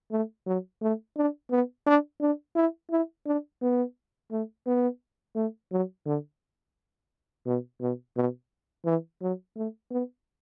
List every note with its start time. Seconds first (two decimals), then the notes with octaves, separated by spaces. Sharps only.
0.11 A3
0.47 F#3
0.82 A3
1.17 D4
1.51 B3
1.87 D4
2.21 D4
2.56 E4
2.91 E4
3.26 D4
3.62 B3
4.31 A3
4.67 B3
5.35 A3
5.71 F#3
6.06 D3
7.46 B2
7.81 B2
8.16 B2
8.85 E3
9.21 F#3
9.56 A3
9.91 B3